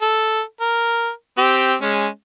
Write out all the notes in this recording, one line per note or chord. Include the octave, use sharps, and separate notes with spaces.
A4
A#4
C4 G4
G#3 C#4